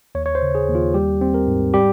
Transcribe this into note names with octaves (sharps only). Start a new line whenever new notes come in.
D#2 C#5
C#5
C5
C#3
G#4
D#2
F4
G3 G4
C4
A#4
G#2
G3 G4